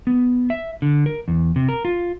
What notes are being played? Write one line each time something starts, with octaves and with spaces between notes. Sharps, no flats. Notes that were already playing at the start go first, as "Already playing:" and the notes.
B3
E5
D3
A#4
E2
C3
A#4
F4